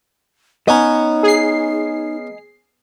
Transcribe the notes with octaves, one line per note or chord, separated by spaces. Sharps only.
B3 C#4 D#4 D#5 A#5
G#4 C7